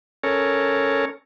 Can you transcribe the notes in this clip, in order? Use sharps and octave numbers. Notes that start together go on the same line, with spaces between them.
C#4 A4 A#4 C#5